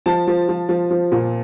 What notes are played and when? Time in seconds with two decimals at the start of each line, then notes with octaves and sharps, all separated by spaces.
0.06 F3 A5
0.27 F3
0.49 F3
0.69 F3
0.91 F3
1.12 A#2